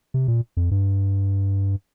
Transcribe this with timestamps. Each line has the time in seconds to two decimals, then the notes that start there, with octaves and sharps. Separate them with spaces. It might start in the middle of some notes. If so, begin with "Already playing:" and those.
0.14 C3
0.28 A#2
0.57 F2
0.71 G2